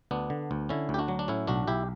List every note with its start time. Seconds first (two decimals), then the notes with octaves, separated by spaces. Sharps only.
0.11 D2 B3 D4
0.30 D3
0.51 D2
0.69 D3 C#4 E4
0.89 D2
0.94 G4
0.99 D4 F#4
1.08 F#3
1.19 D4
1.28 A2 C#4 E4
1.47 B1 D4 F#4
1.68 B1 E4 G4